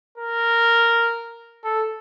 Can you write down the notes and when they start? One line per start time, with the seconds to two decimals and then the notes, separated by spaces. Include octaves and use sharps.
0.17 A#4
1.64 A4